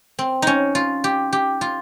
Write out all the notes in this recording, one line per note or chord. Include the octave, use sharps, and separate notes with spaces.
C4
C#4 D#4
F4
G4
G4
F4